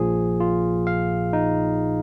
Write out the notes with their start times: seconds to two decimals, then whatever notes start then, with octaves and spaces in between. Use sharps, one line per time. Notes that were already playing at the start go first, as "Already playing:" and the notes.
Already playing: A#1 A#2 F3 G#4
0.40 F4
0.87 F5
1.33 D#4